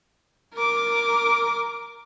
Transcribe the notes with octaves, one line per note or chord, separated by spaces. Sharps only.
A#4 D6